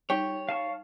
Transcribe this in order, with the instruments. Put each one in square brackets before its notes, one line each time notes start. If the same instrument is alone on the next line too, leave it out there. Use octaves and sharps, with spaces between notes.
[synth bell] G3 D#4 [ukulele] G4 [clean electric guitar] C#5
[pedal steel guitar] F5 A5 C#6